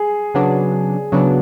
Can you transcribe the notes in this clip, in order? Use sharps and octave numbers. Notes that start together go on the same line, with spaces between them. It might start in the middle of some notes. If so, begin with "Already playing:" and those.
Already playing: G#4
C#3 F#3 B3 D4
C#3 F#3 B3 D4